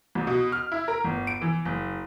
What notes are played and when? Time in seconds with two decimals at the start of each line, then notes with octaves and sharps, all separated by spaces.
0.15 C2
0.27 B2
0.52 F6
0.72 E4
0.88 A#4
1.04 G1
1.27 D7
1.41 E3
1.65 F#1